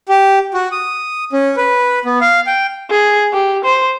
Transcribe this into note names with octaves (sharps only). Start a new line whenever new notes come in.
G4
F#4
D#6
C#4
B4
B3
F5
G5
G#4
G4
C5